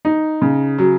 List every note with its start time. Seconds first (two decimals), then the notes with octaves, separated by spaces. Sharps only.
0.05 D#4
0.42 C#3
0.78 F#3